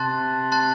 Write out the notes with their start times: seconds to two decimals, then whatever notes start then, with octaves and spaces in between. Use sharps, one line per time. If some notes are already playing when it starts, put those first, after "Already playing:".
Already playing: C3 A5 C6 F#6 A6
0.52 A5 C6 F#6 A6